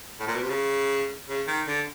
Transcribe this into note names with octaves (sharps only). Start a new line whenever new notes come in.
A2
A#2
B2
C3
C#3
C#3
D#3
D3